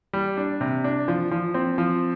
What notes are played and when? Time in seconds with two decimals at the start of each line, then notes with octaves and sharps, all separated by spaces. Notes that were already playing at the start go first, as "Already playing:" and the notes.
0.13 G3
0.37 D4
0.61 C3
0.84 D4
1.08 F3
1.31 F3
1.54 C4
1.78 F3